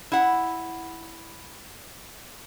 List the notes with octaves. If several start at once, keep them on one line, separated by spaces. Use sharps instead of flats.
E4 F#5